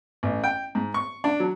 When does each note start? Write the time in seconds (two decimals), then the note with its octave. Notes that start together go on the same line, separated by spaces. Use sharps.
0.23 A1
0.44 G5
0.75 G#2
0.94 C#6
1.24 D4
1.40 F#3